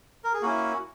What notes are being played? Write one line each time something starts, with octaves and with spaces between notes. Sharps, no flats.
A#4
G#4
A#3 C#4 E4 F#4